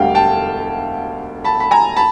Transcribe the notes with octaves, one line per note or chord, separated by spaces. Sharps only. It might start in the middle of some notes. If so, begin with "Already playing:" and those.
Already playing: E1 D2 D3 G3 F5 G5
G5 A5
A5 B5
B5
G#5 A#5
A5 B5